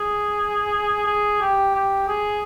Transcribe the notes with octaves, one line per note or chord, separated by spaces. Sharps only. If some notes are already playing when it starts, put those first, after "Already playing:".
Already playing: G#4
G#4
G4
G4
G#4